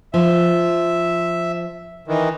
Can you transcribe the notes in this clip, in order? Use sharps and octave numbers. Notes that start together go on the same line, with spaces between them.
F3 E5
D#3 E3